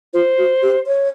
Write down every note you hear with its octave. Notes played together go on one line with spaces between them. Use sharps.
F4 C5
F#4
G4
C#5